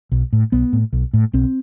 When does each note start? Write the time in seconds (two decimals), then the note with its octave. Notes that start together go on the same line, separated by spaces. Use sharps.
0.12 B1
0.33 A2
0.52 B1 B3
0.73 A2
0.93 B1
1.14 A2
1.33 B1 C4